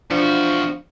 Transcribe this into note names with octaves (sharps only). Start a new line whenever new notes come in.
E2 F3 D4 F#4